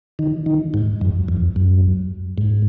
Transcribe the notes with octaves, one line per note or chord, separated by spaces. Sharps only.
D#3
D#3
G#2
F#2
F2
F#2
G#2